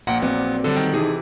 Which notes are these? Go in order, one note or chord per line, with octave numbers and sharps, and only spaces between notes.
A#1 A#2 F#5 G5
F#3 B3 C4 D5
D3 G3 B3 A4
D#3
C3 E3 D#4 G#4 A4